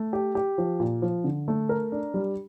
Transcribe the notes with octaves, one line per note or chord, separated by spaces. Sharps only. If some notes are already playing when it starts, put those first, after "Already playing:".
Already playing: A3
G4
G4
F3
A#2
F3
D3
A3
A#4
D4
G3